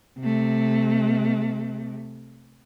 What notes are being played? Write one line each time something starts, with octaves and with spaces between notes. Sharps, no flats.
C3 A3